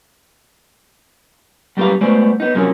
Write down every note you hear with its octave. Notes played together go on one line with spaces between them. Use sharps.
F#3 G3 A#3 G4 B4 F5
G#3 A3 B3 F#4 C5 D5
B3 D#4
F#2 C3 F3 F#3 A#3 C#4